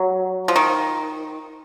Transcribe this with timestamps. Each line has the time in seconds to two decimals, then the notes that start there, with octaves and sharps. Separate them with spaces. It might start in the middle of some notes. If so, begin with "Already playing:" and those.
Already playing: F#3
0.48 F3
0.56 D#3